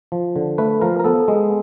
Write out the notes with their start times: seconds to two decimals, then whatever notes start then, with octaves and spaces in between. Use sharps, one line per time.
0.12 F3
0.36 D3
0.58 A3 B4
0.81 F3 A#4
1.00 A#4
1.04 B3 A4
1.28 G#3